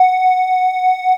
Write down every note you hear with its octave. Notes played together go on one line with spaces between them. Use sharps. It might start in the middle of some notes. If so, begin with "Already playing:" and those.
Already playing: F#5